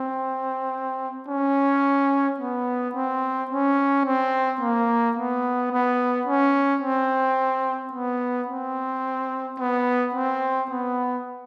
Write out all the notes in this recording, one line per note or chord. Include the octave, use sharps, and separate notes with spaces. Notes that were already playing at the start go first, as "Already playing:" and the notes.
Already playing: C4
C#4
B3
C4
C#4
C4
A#3
B3
B3
C#4
C4
B3
C4
B3
C4
B3